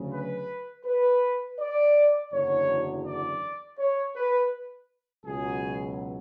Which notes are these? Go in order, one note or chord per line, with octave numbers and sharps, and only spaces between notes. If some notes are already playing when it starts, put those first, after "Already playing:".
Already playing: D2 C#3 F#3
B4
B4
D5
F#1 E2 D3 F#3 C#5
D5
C#5
B4
C#2 B2 F#3 G#4